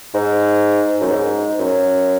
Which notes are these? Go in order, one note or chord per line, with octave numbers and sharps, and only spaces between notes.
G#2
F#2
G#2
F#2